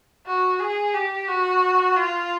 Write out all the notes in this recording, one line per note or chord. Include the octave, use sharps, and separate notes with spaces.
F#4
G#4
G4
F#4
F4